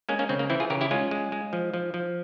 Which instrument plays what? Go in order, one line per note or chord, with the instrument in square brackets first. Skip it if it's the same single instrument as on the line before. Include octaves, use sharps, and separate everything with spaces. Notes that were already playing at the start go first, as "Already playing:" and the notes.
[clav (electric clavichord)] G#3 A#3 C#4
A#3 C#4
C#3 C4
A#3
E3 C4 E4
F4 G#4
C#3 G4 A#4
E4 G4
G#3 C#4 F4
G#3
G#3
F3
F3
F3